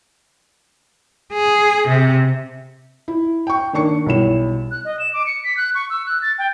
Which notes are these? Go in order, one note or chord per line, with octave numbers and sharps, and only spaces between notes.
G#4
C3
E4
G5 C#6
D#3 A#3 D4 C#6 C#7
B1 G3 E4 E7
F#6
D#5
E7
D6
C#7
B6
F#6
C#6
E6
F#6
A6
G5